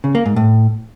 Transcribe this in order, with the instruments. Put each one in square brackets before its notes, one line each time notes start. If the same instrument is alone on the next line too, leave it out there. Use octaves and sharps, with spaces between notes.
[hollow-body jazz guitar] C#3
A#3
G#2
A2